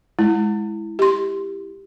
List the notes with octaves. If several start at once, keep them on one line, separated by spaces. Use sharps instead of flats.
G#3 E4
G4 C6